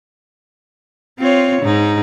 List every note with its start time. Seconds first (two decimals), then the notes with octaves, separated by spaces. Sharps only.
1.19 C4 F4 C#5
1.62 G#2 D#4